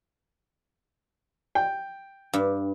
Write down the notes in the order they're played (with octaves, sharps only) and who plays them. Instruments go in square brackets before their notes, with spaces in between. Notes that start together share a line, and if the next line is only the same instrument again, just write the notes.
[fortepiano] G5
[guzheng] G2